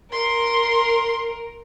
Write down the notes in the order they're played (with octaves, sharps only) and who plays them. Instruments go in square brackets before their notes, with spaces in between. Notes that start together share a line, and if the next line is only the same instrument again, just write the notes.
[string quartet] A#4 [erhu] C6